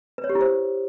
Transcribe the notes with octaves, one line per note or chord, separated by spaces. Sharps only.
B4
C#5
G4
E4
C5